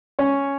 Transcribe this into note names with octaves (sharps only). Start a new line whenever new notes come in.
C#4 C#5